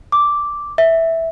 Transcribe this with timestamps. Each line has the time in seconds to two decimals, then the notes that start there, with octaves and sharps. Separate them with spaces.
0.12 D6
0.78 E5